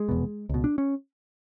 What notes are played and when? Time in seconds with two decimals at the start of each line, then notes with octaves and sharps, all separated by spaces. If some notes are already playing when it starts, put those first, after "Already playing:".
Already playing: G#3
0.09 F1 E2 B2
0.49 C#2 B2
0.64 D4
0.78 C#4